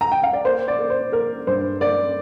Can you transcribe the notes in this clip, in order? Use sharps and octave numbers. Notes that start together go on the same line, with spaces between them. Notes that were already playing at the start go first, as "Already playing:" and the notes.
A#5
G5
F5
D5
A#3 C5
D5
A#3
C5
A#3 A#4
G2 C5
A#3 D5